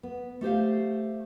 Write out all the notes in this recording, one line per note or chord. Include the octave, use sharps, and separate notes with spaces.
B3
A3 G4 C5 F5